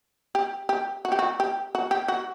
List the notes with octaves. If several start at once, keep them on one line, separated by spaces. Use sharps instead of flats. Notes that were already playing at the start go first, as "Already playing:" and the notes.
G4
G4
F#4
G4
F#4
G4
F#4
G4
F#4